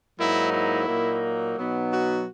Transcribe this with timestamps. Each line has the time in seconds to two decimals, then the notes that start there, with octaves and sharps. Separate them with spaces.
0.19 G#2 F#3 A#3 D#4 E4
0.53 E4
0.87 A#2 F#3 A#3 D#4
1.57 B2 F#3 B3 D#4
1.91 F#4